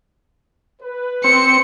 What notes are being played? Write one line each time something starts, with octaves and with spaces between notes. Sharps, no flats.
B4
C4 C#7